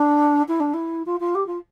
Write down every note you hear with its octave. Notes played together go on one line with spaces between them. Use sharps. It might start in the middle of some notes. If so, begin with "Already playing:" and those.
Already playing: D4
E4
D4
E4
F4
F4
G4
F4